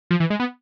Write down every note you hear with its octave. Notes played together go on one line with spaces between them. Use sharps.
F3
E3
G#3
B3